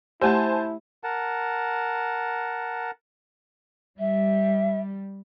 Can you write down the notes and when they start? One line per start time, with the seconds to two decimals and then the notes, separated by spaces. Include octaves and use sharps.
0.21 A3 E4 G4 C5 G#5 A5
1.04 A#4 F#5 A5
3.99 G3 E5